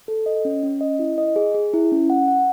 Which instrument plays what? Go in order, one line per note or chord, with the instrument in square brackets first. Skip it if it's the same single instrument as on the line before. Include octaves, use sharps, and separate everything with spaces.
[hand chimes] A4
D#5
C#4
C#4
D#5
E4
D#5
G#4
G#4
E4
C#4
F#5
F#5